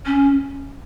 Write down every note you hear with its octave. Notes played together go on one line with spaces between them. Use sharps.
C#4